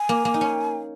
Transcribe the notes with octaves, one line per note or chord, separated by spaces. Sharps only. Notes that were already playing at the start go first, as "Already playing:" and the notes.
Already playing: G#5
A#3
A#3
D#4
C#4